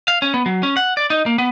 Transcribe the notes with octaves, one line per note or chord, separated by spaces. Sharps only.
F5
C#4
B3
F#3
C#4
F#5
D5
D#4
A#3
B3